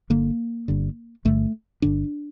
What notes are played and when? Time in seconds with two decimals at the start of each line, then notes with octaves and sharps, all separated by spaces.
0.10 G1 G2 D3 A#3
0.68 G1 G2 D3
1.25 G1 G2 D3 A3
1.82 G1 G2 D3 D4